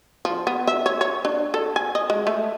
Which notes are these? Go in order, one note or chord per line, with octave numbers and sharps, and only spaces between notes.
F3
B3
E5
C#5
C#5
D4
A4
G#5
D#5
G#3
A3